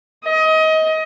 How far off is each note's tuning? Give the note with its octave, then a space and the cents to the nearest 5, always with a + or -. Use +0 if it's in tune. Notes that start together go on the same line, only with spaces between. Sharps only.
D#5 +25